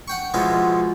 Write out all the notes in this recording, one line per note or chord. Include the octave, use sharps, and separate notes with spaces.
F#5 G5 C#6
B2 F3 G#3 B3 E4 F4